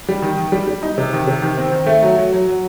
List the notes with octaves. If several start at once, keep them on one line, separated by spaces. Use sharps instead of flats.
G3
D#3
D#3
G3
G3
D#4
C3
D#3
C3
D#3
C4
D#3
A3
F#3
F#3
F#3
F#3